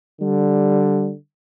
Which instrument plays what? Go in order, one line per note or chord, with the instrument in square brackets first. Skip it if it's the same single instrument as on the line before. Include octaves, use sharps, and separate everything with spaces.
[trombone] D3 [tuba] G3